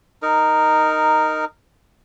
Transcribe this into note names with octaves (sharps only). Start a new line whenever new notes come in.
D#4 A#4